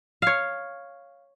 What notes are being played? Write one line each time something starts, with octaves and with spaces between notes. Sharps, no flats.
C#5 F5